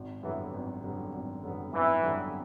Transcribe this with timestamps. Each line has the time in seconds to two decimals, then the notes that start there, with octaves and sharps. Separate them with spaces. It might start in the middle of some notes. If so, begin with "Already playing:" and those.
Already playing: G#1
0.23 F#2 D3 E3 G3 B3
0.54 G#1
0.84 F#2 D3 G3 B3
1.13 G#1
1.44 F#2 D3 G3 B3
1.73 G#1 E3
2.03 F#2 D3 G3 B3